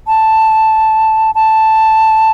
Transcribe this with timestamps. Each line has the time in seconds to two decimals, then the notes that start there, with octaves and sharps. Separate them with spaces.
0.07 A5
1.35 A5